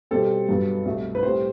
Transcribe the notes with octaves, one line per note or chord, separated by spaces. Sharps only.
B2 G3 C4 A4
G2 F#3 B3
C2 B2 A3
B4
A2 G3 C4 C5